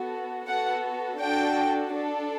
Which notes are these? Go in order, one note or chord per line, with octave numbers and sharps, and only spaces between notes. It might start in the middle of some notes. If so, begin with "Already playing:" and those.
Already playing: B3 F#4 A4
B3 F#4 A4 F#5
D4 F#4 A4 G5
D4 A4